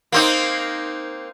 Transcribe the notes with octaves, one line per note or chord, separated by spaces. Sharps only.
A#3 C4 D#4